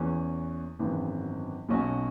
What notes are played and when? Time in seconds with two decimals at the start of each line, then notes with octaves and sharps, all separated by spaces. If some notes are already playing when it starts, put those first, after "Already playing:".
Already playing: E2 E3 C#4
0.79 G#1 F#2 E3 B3
1.69 B1 B2 F#3 C#4 F#4